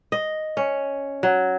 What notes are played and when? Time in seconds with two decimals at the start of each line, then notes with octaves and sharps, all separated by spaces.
0.12 D#5
0.57 C#4
1.23 F#3